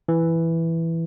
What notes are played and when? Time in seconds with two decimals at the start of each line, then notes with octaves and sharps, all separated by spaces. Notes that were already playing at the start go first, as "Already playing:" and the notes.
0.08 E3